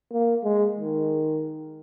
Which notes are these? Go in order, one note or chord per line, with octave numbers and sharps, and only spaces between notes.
A#3
G#3
D#3